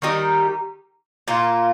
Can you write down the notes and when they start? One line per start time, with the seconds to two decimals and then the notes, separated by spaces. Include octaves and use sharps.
0.02 D#3 G3 D#4 G4
1.28 A#2 A#3 F4